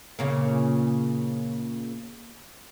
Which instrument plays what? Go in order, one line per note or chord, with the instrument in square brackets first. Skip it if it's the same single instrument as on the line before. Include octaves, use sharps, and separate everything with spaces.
[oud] A#2 C#3 A#3